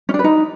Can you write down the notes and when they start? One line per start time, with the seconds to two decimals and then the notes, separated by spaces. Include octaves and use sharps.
0.09 C#4
0.14 D4
0.19 B4
0.24 D#4